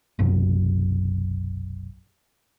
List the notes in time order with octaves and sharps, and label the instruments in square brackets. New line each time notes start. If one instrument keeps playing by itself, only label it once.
[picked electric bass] F#1 B1 F#2 C3